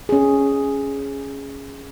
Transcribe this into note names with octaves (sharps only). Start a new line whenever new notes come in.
C#4 G#4